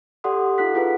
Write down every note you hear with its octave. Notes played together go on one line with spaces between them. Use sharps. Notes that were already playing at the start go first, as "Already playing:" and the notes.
G4 A4 D5 F#5 C6 D#6
D#4 F4 A4 F#5 F#6 B6
E4 F4 G#4 B4 F#5